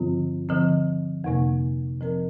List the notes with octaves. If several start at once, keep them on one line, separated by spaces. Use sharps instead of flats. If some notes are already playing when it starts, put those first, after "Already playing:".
Already playing: G2 D3 F3 C4 F4
D3 F3 C4
F2 C3 A#3
F3 C4 A#4 D5